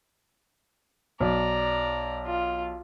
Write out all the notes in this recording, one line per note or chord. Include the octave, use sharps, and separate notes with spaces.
B1 D5 A#5
F4